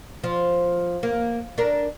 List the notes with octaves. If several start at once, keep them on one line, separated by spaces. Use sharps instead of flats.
F3
A#3
D4 A#4